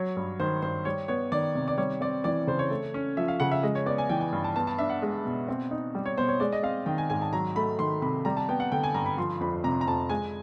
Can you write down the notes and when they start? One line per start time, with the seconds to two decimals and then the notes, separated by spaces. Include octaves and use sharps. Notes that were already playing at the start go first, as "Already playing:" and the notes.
Already playing: F#3 C#5
0.16 G2
0.40 D#3 C5
0.62 G2 C5
0.85 G3 C#5
1.08 B3 C#5
1.32 D#3 D5
1.55 C3
1.68 D5
1.78 G3 C#5
2.01 C4 D5
2.24 E3 D5
2.47 C#3 C5
2.59 C#5
2.70 A3
2.94 C#4
3.17 F3 E5
3.28 F5
3.40 C#3 F#5
3.52 E5
3.63 G#3 D#5
3.75 C#5
3.86 B3 D5
3.98 G#5
4.10 E3 G5
4.20 G#5
4.32 G2
4.44 A5
4.56 B3 A5
4.67 A5
4.79 D4 E5
4.90 F#5
5.02 G#3
5.25 B2
5.48 C4
5.71 D#4
5.95 G3
6.06 C#5
6.17 B2 C5
6.28 C#5
6.40 G#3 D5
6.53 D#5
6.63 C4 F5
6.86 D#3 G5
6.98 G#5
7.10 G#2 G#5
7.21 A5
7.33 F#3 A#5
7.56 A3 B5
7.79 D#3 C6
8.02 C3 B5
8.25 G3 A#5
8.37 A5
8.49 B3 G5
8.60 F#5
8.72 D3 G5
8.84 G#5
8.94 G2 A#5
9.06 B5
9.17 F3 C6
9.40 F2 B5
9.64 C3 A#5
9.81 A#5
9.87 F2 A5
10.10 G#3 G#5